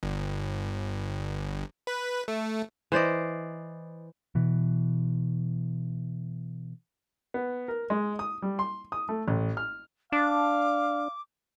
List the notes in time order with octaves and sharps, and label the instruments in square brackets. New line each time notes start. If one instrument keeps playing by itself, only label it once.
[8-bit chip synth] G1
B4
A3
[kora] E3 C5 D5 D#5
[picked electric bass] B2 E3
[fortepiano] B3
A#4
G#3
D#6
G3
C6
D#6
A3
A1
F6
[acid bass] D4 [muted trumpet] F5 [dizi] D6